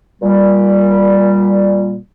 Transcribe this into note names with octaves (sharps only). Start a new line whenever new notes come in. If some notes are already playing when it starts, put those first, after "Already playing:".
A#2 G3